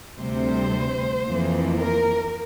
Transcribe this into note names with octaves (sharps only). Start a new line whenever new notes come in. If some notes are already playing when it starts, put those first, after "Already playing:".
D2 C3 G3 C4 C5
F2 E3 A#3
A#4